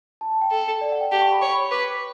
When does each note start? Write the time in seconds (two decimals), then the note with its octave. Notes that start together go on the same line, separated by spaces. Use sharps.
0.21 A5
0.31 A5
0.41 G5
0.51 A4
0.81 D5
0.92 F#5
1.01 G5
1.11 G4 A5
1.21 C#6
1.32 B5
1.41 C#5 C#6
1.52 B5
1.62 C#6
1.71 B4 D6